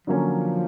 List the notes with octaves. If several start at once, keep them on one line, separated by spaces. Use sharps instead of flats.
D3 F3 F#3 A#3 C#4